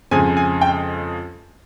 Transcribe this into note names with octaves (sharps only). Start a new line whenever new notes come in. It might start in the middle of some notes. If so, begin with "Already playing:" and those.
F2 C#3 F3 G#3 G#5
G#5
G5